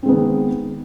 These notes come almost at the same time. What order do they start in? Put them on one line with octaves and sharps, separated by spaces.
C4 G#3 B3 D#3